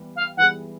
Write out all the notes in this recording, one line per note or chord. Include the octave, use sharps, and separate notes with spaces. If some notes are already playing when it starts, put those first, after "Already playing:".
Already playing: E3 G3 B3
F5
E3 G3 B3 E4 G#4 F#5